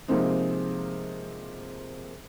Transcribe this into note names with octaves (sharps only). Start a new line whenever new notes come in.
C3 F3 G#3 A#3 C4 D#4